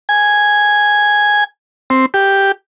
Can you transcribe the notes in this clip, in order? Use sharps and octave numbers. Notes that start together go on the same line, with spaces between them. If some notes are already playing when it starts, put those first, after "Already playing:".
G#5
C4
G4